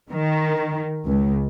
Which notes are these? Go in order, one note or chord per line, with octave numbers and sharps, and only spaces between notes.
D#3
C#2